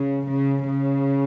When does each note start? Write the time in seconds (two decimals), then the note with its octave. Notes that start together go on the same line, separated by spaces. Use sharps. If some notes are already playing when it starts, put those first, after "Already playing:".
Already playing: C#3
0.29 C#3
0.68 C#3